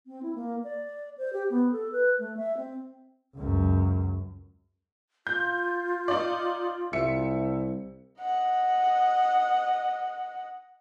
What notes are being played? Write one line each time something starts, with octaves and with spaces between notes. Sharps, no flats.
C4
E4
A#3
D5
C5
G4
B3
A4
B4
A3
E5
C4
C#2 F#2
F4 G6
D#4 D5
C2 E5 C#7
D#5 F#5